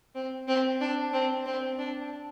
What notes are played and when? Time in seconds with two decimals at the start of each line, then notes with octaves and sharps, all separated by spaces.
0.15 C4
0.48 C4
0.80 D4
1.13 C4
1.45 C4
1.78 D4